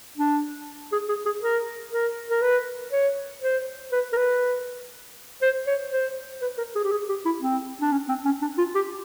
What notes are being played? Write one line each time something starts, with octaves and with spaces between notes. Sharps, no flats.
D4
G#4
G#4
G#4
A#4
A#4
A#4
B4
C#5
C5
B4
A#4
B4
C5
C#5
C5
B4
A#4
G#4
G4
G#4
G4
E4
C4
D4
C#4
C4
C#4
D4
F4
G4